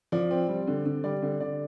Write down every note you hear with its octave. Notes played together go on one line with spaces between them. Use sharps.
F3 D5
C4
G3
D3
D3
G3 D5
D3
D3 D5